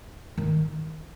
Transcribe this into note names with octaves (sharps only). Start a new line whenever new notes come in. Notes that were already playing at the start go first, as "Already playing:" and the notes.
D#3